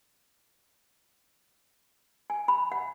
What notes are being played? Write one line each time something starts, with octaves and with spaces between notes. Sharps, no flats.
G#5
B5
F#5